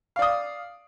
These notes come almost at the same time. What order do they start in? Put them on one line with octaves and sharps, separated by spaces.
F5 D5 D#6